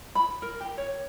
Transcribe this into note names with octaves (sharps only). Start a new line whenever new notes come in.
B5
A#4
G4
C#5